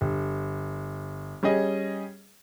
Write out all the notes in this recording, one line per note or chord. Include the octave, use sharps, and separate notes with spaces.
G1
G3 C#4 G#4 D#5